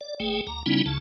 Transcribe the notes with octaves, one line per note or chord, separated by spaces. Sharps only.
D5
G1 A3 G#4 G5
D2 A#5
C#3 G3 B3 C#4 D#4 E4
C#2 C#3 A5